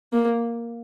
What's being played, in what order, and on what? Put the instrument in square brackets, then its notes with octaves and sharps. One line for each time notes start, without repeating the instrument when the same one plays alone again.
[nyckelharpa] A#3